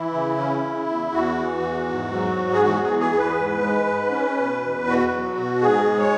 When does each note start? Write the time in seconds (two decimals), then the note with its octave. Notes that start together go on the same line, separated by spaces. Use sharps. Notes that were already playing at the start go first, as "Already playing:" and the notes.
Already playing: E3 E4
0.14 C#3
0.37 C#4
0.62 C#3
0.88 E2
1.12 E2 F#4
1.38 E3
1.63 E2
1.88 G#2
2.12 F#3
2.37 G#2
2.53 G#4
2.62 E2 F#4
2.81 G#4
2.87 E3
2.99 G#4
3.11 E2
3.18 B4
3.38 G#2
3.62 G#3
3.87 G#2
4.11 C#4
4.37 B2
4.62 E2
4.87 B2 F#4
5.11 F#3
5.37 B2
5.61 G#2 G#4
5.87 G#3
5.99 C#5